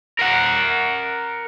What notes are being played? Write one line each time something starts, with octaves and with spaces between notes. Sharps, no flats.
A#4 F#5